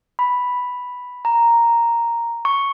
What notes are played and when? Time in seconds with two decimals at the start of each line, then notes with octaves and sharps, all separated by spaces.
0.19 B5
1.25 A#5
2.45 C#6